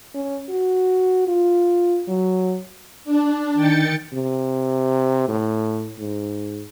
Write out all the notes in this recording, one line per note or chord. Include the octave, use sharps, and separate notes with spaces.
C#4
F#4
F4
F#3
D4
D#3 G5 A6 C#7
C3
A2
G#2